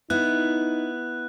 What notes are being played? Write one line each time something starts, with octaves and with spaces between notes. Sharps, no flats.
B3 D#4 E4 F#6